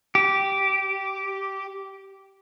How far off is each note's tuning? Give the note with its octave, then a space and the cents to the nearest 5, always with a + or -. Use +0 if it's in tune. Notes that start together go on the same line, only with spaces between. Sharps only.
G4 -10